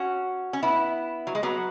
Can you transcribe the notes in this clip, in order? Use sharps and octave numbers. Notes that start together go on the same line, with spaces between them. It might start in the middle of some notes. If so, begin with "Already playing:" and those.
Already playing: C#4 F#4
C#4
B3 E4
F#3
G#3
F#3 B3